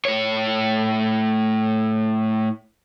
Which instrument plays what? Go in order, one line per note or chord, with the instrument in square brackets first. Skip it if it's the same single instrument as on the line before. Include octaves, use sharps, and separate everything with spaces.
[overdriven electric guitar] A2 C#5